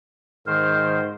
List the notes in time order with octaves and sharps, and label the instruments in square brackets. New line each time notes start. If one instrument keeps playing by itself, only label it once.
[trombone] G#2 [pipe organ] D#3 C5 [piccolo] F6